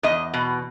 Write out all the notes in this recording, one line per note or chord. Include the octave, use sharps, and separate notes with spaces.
E2 D#5
B2